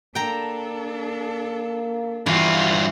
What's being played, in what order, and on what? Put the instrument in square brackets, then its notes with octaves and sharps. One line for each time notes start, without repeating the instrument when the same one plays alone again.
[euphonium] A#3 [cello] D4 A4 [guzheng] G5 A#5
[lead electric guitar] G2 F4 [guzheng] E3 [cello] F#4 F5